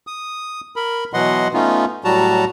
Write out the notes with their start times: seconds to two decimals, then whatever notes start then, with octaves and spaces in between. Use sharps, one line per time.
0.07 D#6
0.76 A#4 B5
1.13 B2 E3 F#3 D#5 F#5 C6
1.54 A3 B3 C#4 D#4 F4
2.04 A2 F#3 G3 F#4 A5 A#5